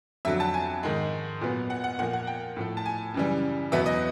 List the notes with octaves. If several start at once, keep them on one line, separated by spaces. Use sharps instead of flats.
F2 D3 F#3 E5
A5
G#5
G#2 D#3 G#3
A#2 F#3 B3
F#5
F#5
A#2 F3 A#3 F#5
F#5
G5
A2 F3 A3
A5
G#5
F#2 C#3 E3 G3
E2 B2 F#3 B3 E5
D#5